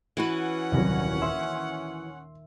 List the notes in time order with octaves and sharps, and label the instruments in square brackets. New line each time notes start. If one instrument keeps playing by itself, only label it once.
[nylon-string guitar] E3 F#4 B4 [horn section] C#4 F#5
[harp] D#1 A#6 [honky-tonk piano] C2 F#3
[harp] E5 [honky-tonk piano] C6